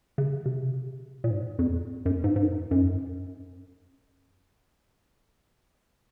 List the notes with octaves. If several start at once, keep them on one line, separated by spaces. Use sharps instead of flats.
C#3
C3
A#2
G#2
F2
F#2
G#2
G#2
F#2
F#2